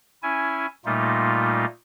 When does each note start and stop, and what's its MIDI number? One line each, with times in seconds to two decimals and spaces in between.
0.23 0.66 61
0.23 0.66 64
0.23 0.66 80
0.85 1.65 46
0.85 1.65 55
0.85 1.65 57
0.85 1.65 58
0.85 1.65 63
0.85 1.65 65